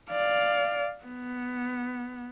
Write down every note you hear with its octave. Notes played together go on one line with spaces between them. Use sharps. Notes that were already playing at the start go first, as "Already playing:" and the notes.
D5 F5
B3